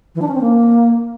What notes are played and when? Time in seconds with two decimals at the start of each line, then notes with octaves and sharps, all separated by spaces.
0.15 E3
0.21 D4
0.28 C#4
0.34 C4
0.41 A#3